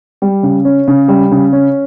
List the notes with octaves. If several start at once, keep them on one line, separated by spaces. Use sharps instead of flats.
G3
C#3
C#4
C#3
G3
C#3
C#4